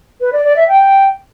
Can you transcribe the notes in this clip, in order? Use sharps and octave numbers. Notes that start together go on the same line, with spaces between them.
B4
D5
D5
E5
G5